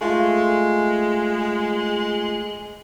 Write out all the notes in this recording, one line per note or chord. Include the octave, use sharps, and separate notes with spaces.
G#3 A3 F4